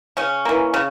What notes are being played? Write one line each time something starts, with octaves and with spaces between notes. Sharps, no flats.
C#3 C#4
E3 A#3
C#3